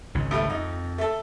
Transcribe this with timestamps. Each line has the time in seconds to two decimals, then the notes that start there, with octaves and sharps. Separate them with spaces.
0.15 G#1 C#2 C#3
0.31 A2 G3 A3
0.50 F2 D#4
0.98 A3 A4